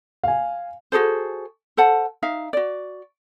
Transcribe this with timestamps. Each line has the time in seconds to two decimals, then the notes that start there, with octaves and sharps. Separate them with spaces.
0.24 F5 G#5
0.92 F#4 G#4 A4 C5
1.77 A4 C5 F#5 A5
2.23 D#4 E5 F5
2.53 F#4 D5